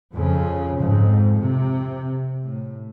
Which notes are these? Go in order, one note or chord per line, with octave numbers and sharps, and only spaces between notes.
F2 C#3
F2 G#2
C3
A2